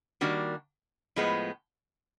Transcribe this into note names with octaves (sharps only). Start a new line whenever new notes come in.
D#3 G3 A#3 D4 F#4
A2 F3 G#3 B3